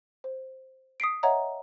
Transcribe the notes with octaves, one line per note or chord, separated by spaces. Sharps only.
C5
D#6 B6 C7 D7
C#5 D#5 E5 F#5 A#5